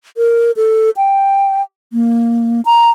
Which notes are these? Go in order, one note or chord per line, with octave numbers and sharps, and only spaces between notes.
A#4
A4
G5
A#3
A#5